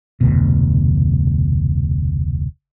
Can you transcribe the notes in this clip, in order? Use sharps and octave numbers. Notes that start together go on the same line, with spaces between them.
F1 D2 B2